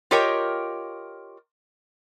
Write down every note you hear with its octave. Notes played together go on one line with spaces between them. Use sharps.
F4 G4 A#4 C#5 D#5 G5